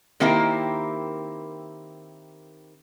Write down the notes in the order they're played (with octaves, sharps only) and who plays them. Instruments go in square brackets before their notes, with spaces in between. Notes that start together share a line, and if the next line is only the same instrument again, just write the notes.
[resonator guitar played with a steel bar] D#3 A#3 C4 E4 G4 A#4